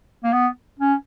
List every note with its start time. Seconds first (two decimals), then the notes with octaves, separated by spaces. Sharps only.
0.24 A#3
0.33 B3
0.80 C#4